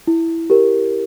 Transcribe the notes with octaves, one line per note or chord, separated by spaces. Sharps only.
E4
G4 A#4